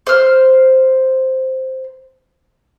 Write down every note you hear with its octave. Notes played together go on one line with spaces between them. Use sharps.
C5 F6